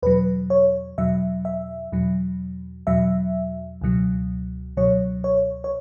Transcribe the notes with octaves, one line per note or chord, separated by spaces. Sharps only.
E2 B2 F#3 B4
C#5
E2 B2 F#3 E5
E5
E2 B2 F#3
E2 B2 F#3 E5
C#2 B2 F#3
C#2 B2 F#3 C#5
C#5
C#5